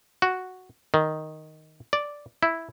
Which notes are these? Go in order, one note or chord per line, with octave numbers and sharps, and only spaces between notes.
F#4
D#3
D5
E4